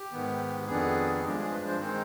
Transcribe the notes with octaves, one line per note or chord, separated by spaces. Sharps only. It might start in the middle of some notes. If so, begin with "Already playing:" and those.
Already playing: G4
G#2 D#3 B3
F2 D#3 B3 D4 G#4
G#4
G2 F3 G#3 D4 G4
G#4
B4
C5
D#3 G#3 C4 D#4 C5